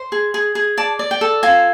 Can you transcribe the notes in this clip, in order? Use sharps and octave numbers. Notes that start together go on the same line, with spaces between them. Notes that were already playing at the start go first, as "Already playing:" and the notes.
Already playing: C5
G#4
G#4
G#4
D5 A5
D5
G5
A4
F4 G#5